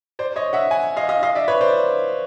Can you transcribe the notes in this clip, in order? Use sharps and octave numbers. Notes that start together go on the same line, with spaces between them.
C5 D5
C#5 D#5
E5 F#5
F#5 G#5
D#5 F5
D#5 F5
D#5 F5
D5 E5
B4 C#5
C5 D5